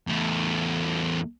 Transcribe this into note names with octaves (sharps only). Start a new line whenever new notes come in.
E2 A3